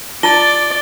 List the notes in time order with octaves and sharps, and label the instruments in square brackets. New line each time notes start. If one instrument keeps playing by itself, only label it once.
[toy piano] F4 A5 [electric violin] D5 [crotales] A6 G7